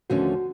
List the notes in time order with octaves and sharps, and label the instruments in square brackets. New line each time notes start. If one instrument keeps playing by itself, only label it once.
[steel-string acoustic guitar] D#2 D3 F3 A3 C#4 [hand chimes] F#4